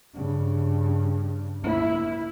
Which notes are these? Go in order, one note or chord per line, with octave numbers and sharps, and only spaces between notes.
G2 C#3
A#3 E4